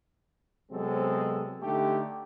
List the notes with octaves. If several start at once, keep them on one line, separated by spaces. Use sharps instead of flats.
C3 F#3 G#3 B3 C4 A4
D3 A3 D#4 G4